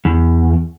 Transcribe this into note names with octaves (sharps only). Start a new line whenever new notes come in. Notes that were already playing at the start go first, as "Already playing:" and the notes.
E2